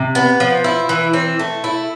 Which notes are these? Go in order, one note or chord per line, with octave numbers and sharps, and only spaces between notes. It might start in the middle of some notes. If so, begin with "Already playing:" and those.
Already playing: C3
B3
F3
E4
E3
C4
A3
E4